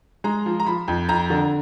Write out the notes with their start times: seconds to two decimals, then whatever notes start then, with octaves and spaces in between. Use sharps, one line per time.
0.24 G#3 A#5
0.46 F3
0.60 A#5
0.66 F3 B5
0.88 F2
1.09 F2 A#5
1.30 D3